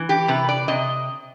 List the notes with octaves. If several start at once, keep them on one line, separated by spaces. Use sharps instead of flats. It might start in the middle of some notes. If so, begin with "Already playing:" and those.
Already playing: E3
G4
C3 B4
D5
C3 D#5